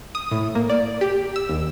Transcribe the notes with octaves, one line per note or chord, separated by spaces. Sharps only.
D#6
A2
A#3
D5
G4
E6
D#2